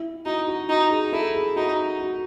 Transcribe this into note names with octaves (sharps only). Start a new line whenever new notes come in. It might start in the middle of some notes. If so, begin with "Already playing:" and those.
Already playing: E4
D#4 F#4
F#4
D#4 F#4
G#4
E4 A4
G#4
D#4 F#4
F#4